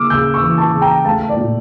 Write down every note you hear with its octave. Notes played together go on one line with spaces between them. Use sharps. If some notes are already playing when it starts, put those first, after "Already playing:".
Already playing: C#3 A#3 D6 E6 F6
C#3 E6 G6
C#6 E6
E3
A5 C#6
C#3
G5 A#5
A3 F5 A5
D5
A#2